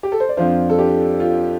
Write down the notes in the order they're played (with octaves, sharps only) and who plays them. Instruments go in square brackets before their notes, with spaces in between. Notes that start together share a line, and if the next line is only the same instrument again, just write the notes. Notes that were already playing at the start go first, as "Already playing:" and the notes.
[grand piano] G4
A4
C5
D5
F2 F3 D4 C5 F5
A4
D4 G4
F4